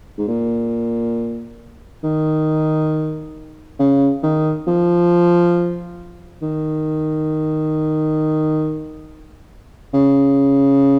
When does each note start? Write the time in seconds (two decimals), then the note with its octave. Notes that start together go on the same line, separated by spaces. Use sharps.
0.18 G#2
0.28 A#2
2.04 D#3
3.79 C#3
4.23 D#3
4.67 F3
6.42 D#3
9.94 C#3